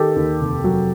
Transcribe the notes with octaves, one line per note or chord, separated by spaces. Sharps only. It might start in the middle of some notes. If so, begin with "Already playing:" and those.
Already playing: D#3 G4 A4
D#2
F1
F#3